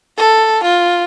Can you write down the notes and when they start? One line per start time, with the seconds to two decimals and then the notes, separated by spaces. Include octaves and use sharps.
0.17 A4
0.63 F4